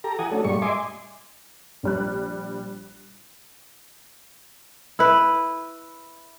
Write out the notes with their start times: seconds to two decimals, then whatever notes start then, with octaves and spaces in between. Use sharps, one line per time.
0.04 G4 A4 A#5
0.19 E3 G4 F#5 G#5 D#6
0.32 A3 C#4 D4 F#4 A4
0.45 G2 A#2 G3 G#3 D4 C#6
0.62 D#5 E5 G#5 C6 D6
1.83 A#1 G3 F#6
4.99 E4 B4